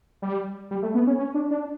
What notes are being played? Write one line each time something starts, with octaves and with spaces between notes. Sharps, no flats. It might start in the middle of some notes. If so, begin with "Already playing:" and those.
G3
G3
A3
B3
C#4
C#4
D4
D4